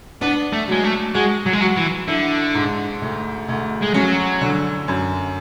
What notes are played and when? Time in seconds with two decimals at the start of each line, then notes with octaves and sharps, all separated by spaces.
0.21 B3 D4
0.53 A3
0.68 F#3 G#3
0.84 A3
1.14 G#3 F#4
1.46 F#3
1.53 G#3
1.61 F#3 F#4
1.77 E3
2.08 D3 E4
2.54 G#2
3.02 D2
3.48 D2
3.83 G#3
3.94 F#3 C#4
4.41 D3
4.88 F#2